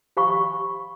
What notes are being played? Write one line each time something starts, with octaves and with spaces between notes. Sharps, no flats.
G4 C5 F5 B5 C#6